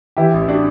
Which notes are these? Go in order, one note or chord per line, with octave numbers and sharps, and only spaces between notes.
E3 E4 G4
A1
D4 F#4